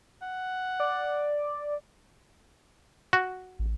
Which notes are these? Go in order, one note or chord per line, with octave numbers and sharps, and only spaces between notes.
F#5
D5
F#4
A1